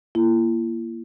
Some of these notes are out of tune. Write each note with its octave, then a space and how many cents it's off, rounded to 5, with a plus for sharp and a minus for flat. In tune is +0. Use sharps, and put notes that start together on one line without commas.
A#3 +0 E4 +40